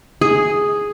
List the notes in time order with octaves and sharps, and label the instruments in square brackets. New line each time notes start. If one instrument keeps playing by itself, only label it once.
[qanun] G#4